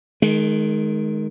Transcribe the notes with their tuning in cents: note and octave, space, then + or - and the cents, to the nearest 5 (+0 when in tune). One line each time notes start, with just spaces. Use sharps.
D#3 +0 G#3 +30